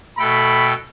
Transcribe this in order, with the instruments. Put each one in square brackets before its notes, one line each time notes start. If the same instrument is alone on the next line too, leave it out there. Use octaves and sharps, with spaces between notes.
[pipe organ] B2 A4 G5 [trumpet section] A3 B5